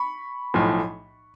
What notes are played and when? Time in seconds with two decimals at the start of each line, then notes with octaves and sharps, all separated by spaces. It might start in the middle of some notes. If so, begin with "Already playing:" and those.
Already playing: B5 C#6
0.54 B1 A2 F3